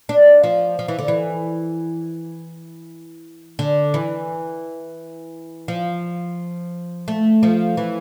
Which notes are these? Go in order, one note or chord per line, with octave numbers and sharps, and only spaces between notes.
D4
F3
F3
E3
D3
E3
D3
E3
F3
A3
F3
E3